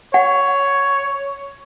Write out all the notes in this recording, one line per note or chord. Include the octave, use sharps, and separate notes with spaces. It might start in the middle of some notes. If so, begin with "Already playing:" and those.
C#5 F#5